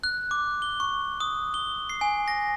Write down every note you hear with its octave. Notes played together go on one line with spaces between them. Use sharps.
F#6
D6
G7
C#6
D#6
G7
C7
G#5
A#6